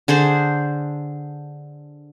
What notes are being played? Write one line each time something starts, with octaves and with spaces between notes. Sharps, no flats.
D3 G#4 C5 D5